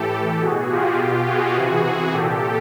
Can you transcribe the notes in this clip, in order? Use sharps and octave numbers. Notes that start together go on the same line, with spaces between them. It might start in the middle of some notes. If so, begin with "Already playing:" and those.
Already playing: A2 E3 G4 A4
B2 F#4 G#4
F4 G4
B2
F#4 G#4
C3 E3
A#2 G4 A4